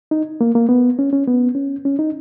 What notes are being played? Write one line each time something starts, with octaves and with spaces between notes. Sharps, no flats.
D#4
A#3
A#3
B3
C#4
C#4
B3
C#4
C#4
D#4